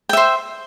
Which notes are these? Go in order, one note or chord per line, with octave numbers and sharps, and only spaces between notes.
C5 E5 G5